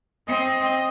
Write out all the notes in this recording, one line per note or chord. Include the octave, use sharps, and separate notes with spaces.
C4 D#5